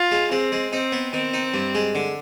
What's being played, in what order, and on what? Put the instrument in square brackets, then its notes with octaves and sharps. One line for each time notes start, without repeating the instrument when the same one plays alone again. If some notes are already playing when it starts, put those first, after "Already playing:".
Already playing: [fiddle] F4
[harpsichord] G#3
[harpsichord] G#3 [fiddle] C4
[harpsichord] G#3
[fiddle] C4 [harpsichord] D#4
[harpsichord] B3
[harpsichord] D#3 [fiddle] C4
[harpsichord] D#4
G2
G#3
D3